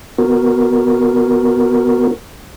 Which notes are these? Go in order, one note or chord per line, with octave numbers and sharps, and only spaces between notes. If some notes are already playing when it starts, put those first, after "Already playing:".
B3 F#4 A#4